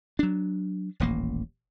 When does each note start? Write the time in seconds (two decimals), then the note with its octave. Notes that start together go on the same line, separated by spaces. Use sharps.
0.19 F#3 D4
1.00 D#1 A1 A#3